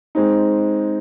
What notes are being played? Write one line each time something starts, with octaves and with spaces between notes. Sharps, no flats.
G#3 C4 D#4